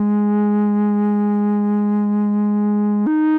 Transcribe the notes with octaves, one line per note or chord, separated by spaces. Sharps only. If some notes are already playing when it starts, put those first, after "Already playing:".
Already playing: G#3
D#4